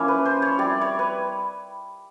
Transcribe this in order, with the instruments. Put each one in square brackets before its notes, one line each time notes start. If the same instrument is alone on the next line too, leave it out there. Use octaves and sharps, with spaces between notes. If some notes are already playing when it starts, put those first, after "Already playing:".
Already playing: [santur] F3 A#3 C#4 E4
B4
C5
C#5
G3 C4 E4 D5
C#5
B4